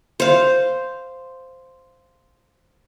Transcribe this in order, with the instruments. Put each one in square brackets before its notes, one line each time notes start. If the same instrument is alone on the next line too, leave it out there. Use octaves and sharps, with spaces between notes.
[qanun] C5 F5